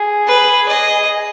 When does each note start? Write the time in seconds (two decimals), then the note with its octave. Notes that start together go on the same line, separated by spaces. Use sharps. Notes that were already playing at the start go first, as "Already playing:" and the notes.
Already playing: G#4
0.28 B4
0.68 D#5